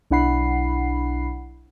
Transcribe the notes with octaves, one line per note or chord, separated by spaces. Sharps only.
B1 D4 E4 F#5 B5 C7